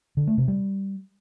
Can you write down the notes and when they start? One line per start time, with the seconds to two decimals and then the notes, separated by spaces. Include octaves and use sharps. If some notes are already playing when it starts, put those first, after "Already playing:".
0.17 D3
0.27 A3
0.38 C3
0.48 G3